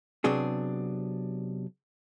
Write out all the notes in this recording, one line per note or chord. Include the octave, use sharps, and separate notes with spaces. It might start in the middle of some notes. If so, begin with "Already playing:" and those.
C3 F#3 B3 D4 G#4